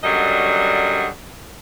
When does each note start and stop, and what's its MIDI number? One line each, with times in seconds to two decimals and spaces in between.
0.04 1.08 42
0.04 1.08 50
0.04 1.08 54
0.04 1.08 55
0.04 1.08 75